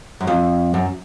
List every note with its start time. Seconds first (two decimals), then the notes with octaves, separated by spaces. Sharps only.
0.21 F#2
0.27 F2
0.74 F#2